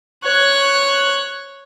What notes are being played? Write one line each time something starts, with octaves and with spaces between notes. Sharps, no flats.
C#5 F#6